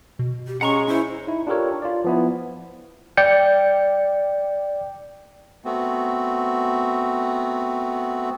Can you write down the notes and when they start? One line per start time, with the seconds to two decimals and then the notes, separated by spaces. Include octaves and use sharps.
0.19 B2
0.47 G4
0.61 G#3 C#4 F#5 A#5 C#6
0.88 C#4 E4 C5
1.27 D#4 E4
1.47 D4 F4 G4 A4 A#4 C#5
1.82 F4 D5
2.05 F3 B3 E4
3.17 D5 G5 G6 C#7
5.65 A3 B3 C4 F#4